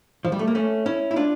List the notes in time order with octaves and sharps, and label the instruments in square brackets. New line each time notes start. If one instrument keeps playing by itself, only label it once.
[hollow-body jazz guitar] F3
G3
A3
A#3
A3 C#4
C#4 E4
E4
D4 F4